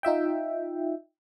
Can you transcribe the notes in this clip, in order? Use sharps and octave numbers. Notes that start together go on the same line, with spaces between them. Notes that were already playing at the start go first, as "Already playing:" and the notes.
D#4 F4 E5 G5